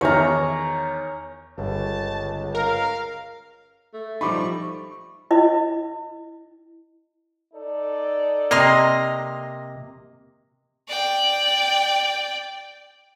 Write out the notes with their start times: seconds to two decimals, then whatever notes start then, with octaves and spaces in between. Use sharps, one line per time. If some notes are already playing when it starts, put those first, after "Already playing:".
0.01 E2 D#3 C#5 A#5 F6
1.58 G1 C#2 A5
2.55 A#4 F5
3.94 A3
4.21 F3 G3 D#4 B5 C#6 D6
5.31 E4 D#5
7.54 D#4 A4 D5
8.51 C3 A#3 D#5 A#5 C6
10.88 D5 G5